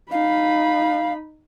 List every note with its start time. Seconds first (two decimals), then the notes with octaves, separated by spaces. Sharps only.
0.12 D#4 F5 B5